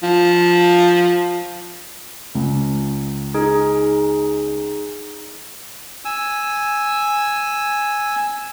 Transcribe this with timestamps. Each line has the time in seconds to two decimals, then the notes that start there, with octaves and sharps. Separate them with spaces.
0.03 F3
2.35 C#2
3.34 D#4 G#4
6.05 G#5 E6